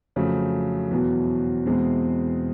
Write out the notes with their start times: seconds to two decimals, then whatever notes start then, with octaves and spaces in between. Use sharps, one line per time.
0.16 F2 C#3 F#3 A3
0.91 E2 B2 F#3
1.65 E2 B2 G#3 C4